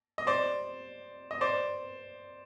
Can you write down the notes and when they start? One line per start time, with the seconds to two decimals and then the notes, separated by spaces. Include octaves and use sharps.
0.18 D#5
0.27 C5 D5
1.31 D#5
1.41 C5 D5